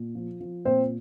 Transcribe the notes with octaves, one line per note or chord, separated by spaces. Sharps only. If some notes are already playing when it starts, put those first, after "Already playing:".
Already playing: A#2
F3
F3
A#2 C4 C5